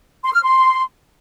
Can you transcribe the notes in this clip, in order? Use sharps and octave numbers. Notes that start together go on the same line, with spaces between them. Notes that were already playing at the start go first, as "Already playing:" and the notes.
C6
F6
C6